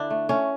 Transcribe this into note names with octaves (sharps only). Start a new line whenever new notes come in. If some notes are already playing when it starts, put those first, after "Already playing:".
Already playing: D3 D4 E4
A3
A3 C#4